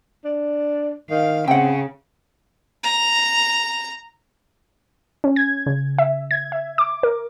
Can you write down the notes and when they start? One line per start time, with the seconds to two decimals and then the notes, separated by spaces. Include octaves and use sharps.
0.25 D4
1.10 D#3 F5
1.48 C#3 C4 F#5 G5
2.83 A#5
5.24 C#4
5.36 G#6
5.66 C#3
5.98 E5
6.31 G#6
6.52 E5
6.78 D6
7.03 A#4